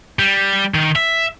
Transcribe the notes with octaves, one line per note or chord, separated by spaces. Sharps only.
G3
D#3
E5